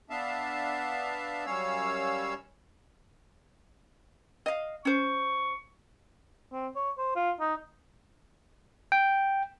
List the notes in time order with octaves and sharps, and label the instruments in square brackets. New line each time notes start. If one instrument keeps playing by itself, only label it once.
[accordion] B3 D4 E5 F5 A5
F#2 G3 C#4 C#5 F5 E6
[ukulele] D#5 F5
[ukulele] C#4 C5 [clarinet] C#6
[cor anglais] C4
C#5
C5
F4
D#4
[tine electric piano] G5